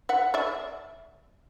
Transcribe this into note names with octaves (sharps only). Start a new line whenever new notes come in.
E5 F#5
D5 E5